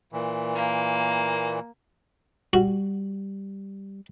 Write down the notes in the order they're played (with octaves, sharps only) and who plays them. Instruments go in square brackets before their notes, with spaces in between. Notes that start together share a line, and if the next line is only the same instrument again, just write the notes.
[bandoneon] A#2 E3
[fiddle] A#3
[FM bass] G3 [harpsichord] F#4